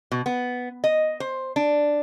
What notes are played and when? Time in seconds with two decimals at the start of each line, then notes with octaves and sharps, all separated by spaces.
0.12 B2
0.26 B3
0.84 D#5
1.20 C5
1.56 D4